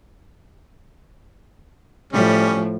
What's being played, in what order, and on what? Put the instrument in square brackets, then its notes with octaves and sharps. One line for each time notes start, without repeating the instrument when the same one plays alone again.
[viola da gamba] A2 F3 [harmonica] G3 C#4